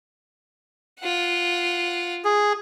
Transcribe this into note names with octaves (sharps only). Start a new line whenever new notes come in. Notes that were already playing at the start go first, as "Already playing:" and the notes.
F4 F#5
G#4